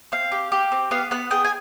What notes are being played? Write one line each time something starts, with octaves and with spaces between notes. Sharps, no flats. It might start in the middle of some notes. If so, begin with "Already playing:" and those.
C4 F5
G4
G4
C4
B3 F5
B3 F#5
G#4 G5
G#5